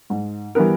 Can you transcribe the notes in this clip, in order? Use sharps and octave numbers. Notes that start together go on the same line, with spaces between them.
G#2
E3 G3 B3 A#4